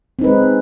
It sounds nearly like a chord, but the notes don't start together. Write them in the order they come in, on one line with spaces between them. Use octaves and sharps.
C4 D#4 B4 G#3